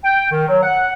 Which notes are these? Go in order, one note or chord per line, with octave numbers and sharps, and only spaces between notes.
G5
D#3
F#3
F#5